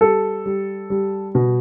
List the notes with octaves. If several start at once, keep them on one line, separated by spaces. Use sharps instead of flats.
G3 A4
G3
G3
B2